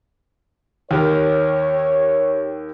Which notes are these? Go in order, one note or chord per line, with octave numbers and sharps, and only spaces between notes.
D#2 G4 A#4 C#5